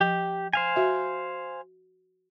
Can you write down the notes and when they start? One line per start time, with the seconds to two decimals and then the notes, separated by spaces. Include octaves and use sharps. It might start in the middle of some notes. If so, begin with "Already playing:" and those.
0.01 F3 G4
0.53 C5 F5 G#5
0.76 F#4 E5